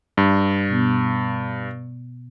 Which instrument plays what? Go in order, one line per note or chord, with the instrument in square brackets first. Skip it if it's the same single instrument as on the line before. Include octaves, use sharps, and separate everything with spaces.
[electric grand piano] G2
[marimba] B2 B3